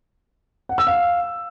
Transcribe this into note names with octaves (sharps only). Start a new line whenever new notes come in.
F#5
E6
F5